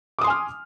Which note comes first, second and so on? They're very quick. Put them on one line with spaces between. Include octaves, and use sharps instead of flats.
D6 D#6 C6 G#5 F6